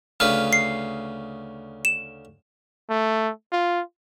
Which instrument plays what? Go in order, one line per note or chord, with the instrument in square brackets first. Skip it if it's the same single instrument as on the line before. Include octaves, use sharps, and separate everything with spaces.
[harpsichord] D2 C#3 B4 [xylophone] F6
[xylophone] C7
E7
[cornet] A3
F4